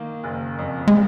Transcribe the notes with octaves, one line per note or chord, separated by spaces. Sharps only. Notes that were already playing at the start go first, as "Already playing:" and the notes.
Already playing: D#3 A#3
F#1
F2
G#3